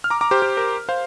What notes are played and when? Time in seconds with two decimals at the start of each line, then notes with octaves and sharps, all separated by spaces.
0.04 F6
0.10 A#5 D6
0.21 A#5 D6
0.31 G4 C5
0.42 G4
0.57 A#4
0.89 C5 F5